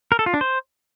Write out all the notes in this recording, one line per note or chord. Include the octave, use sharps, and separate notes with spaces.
A#4
A4
F4
D4
C5